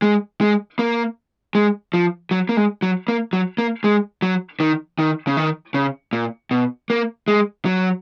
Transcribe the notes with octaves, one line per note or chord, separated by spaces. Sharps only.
G#3
G#3
A#3
G#3
F3
F#3
A#3
G#3
F#3
A#3
F#3
A#3
G#3
F#3
D#3
D#3
C#3
D#3
C#3
A#2
B2
A#3
G#3
F#3